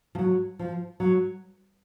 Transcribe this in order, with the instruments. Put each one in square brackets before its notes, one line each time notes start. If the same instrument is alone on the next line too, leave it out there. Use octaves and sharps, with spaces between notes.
[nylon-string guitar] F3
F#3
F3
F#3